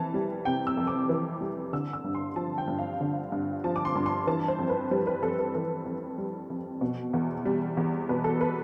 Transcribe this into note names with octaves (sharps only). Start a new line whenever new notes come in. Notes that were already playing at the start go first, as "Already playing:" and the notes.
Already playing: F2 C3 E3 A5
G3
C3 G5
E6
F2
D6
E3
G3
D3 E6
E6
G2
C6
F3 A5
G5
G2
F5
D3
G2
F3 A5
D6
C6
G2
C6
E3 A5
C5
F2
B4
G3 C5
B4
F2 A4
B4
E3 A4
F2
G3
F2
B2
E2
G3
E2
B2 B4
A4
B4